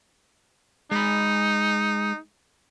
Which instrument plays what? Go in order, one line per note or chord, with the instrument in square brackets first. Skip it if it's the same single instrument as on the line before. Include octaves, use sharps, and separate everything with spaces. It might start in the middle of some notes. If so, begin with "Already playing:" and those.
[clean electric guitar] G#3 B5 [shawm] D#4